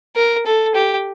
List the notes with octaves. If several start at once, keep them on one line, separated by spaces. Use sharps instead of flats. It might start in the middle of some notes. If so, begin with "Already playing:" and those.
A#4
A4
G4